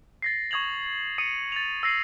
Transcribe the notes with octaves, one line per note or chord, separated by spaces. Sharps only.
A6 A#6 C7
C#6 D#6 G#6 F7 F#7
D#6 C#7 D#7
A6 F7
E6 A#6 C7 D#7 F#7